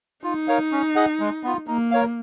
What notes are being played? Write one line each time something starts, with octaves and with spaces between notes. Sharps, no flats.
D#4 F4
A#4 C#5 F5
C#4
G#4 D#5 F#5
G#3
B3 F4
A#3 D#4
A#4 C#5 F5